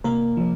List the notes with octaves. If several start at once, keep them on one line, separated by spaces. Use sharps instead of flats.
C3 A#3 A#4
F3